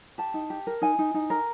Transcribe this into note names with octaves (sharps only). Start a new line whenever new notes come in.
G4 A5
D#4
G4
A#4
D#4 G#5
D#4
D#4
A#4